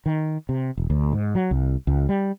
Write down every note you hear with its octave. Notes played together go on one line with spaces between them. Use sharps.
D#3
C3
E1
D2
G#2
F#3
C2
C#2
G3